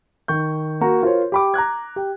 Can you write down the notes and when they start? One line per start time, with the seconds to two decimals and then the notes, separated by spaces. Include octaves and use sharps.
0.28 D#3 C#6 G6
0.81 A#3 F#4 A#5
1.03 F4 A#4 C5 C#5
1.32 G4 B5 D6
1.54 A#5 D6 F#6 G#6
1.96 G4